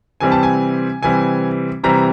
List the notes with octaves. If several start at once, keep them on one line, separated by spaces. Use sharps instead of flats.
C3 E3 G3 C4 G#5
A5
G#5
C3 E3 G3 C4 G#5
C3 E3 G3 C4 A#5